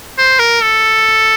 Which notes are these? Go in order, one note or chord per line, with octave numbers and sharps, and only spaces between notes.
C5
A#4
A4